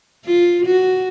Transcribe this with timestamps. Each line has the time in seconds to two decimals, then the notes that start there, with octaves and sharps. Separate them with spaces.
0.25 F4
0.66 F#4